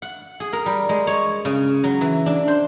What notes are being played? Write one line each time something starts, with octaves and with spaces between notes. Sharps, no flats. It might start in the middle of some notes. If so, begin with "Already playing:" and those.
F#5
G#4
A#4
G3
G#3
C#5
C#3
F#3
E3
D4
C5